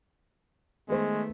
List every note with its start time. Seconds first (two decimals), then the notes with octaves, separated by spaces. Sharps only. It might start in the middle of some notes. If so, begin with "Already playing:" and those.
0.89 D#3 G#3 A3 B3 G#4 C5